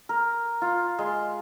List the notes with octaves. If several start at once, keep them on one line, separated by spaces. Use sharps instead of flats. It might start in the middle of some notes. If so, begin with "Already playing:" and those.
A#4
F4
G#3